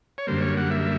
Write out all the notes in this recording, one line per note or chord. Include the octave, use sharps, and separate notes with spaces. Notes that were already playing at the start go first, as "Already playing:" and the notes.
C#5
F#2 D3 G3 A#3 C5
C#5
F#5
E5